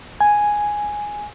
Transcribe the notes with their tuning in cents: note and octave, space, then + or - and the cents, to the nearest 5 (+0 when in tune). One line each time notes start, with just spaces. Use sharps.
G#5 +0